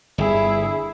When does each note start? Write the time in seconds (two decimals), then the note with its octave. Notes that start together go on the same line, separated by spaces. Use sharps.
0.18 G1 E4 G#4